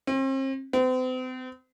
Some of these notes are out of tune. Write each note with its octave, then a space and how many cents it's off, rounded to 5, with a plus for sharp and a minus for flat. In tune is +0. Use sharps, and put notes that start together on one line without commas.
C4 +40
C4 -40